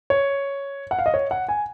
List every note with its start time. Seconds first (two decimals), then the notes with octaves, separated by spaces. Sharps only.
0.10 C#5
0.91 F#5
0.99 F5
1.06 D#5
1.14 C#5
1.31 F#5
1.49 G#5